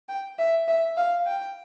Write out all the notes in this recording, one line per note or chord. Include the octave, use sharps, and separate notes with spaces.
G5
E5
E5
F5
G5